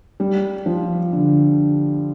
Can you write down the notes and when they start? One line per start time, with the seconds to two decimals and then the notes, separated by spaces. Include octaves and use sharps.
0.20 G3
0.66 F3
1.13 D3